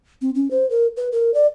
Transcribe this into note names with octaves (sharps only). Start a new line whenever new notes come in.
C4
C#4
C5
A#4
B4
A#4
D5